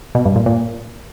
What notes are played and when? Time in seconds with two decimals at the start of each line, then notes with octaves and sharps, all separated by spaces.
0.15 B2
0.25 G2
0.36 A#2
0.46 A#2